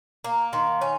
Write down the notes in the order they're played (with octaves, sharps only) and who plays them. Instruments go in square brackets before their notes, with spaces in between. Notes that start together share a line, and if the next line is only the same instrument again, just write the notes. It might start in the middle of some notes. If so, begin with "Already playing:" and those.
[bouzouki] A#3 [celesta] A#5
[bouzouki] D#3 [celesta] C6
[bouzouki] C#4 [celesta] C#5